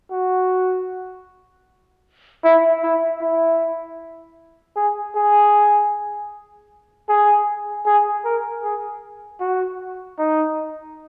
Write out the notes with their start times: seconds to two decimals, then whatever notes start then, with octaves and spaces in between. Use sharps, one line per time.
0.11 F#4
2.44 E4
2.83 E4
3.22 E4
4.76 G#4
5.15 G#4
7.09 G#4
7.86 G#4
8.24 A#4
8.63 G#4
9.40 F#4
10.18 D#4